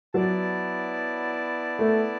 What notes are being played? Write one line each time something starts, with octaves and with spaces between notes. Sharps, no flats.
F#3 B3 E4 D5 A5
A3